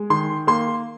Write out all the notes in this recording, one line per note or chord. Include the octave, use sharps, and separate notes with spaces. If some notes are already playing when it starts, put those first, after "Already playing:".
Already playing: G#3
D#3 C6
A#3 C6